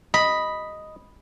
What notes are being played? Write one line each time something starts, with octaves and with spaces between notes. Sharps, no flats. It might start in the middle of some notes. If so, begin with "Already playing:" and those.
D#5 B5